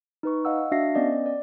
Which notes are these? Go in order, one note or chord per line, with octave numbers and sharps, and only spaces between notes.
D#4 B4 C#6
D#5 F5 F#5 E6
D4 F#4 E5 F5 A#6 C7
B3 C#4 D5 D#5
D5